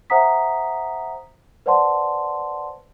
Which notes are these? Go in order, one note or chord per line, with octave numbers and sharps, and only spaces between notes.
C5 E5 F#5 A#5 D#6 B6
B4 C5 D5 F#5 A5 C6